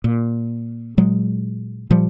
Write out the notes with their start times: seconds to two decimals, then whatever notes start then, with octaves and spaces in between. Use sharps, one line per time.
0.04 A#2
0.97 A#2 F#3 G#3
1.90 A#2 F3 G3